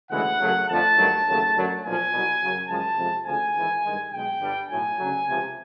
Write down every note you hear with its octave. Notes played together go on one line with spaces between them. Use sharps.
D2 C#3 E3 G#3 F#5
F#2 C#3 F#3 A3
F2 D3 F3 A3 A5
G2 D#3 F#3 A3
D#2 C#3 F#3 A3
F#2 D3 F#3 A3
B1 A#2 F3 G#5
C2 B2 F#3
F#2 C#3 F#3
F#2 C#3 F3 G#3 A5
F2 C3 F3 G#3
D2 C#3 F3 G#5
G#1 G#2 E3
G2 D#3 G#3
B1 B2 G#3 G5
G1 G2 D3 G3
B1 A2 F#3 A3 G#5
D2 C#3 F#3 A3
C#2 C3 F3